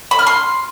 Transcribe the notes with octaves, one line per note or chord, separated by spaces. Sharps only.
B5
F6
C6